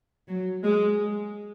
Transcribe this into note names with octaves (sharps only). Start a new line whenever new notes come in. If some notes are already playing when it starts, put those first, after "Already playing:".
F#3
G#3